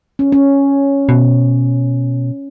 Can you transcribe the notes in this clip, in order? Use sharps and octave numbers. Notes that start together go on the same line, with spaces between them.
C#4
C#4
B2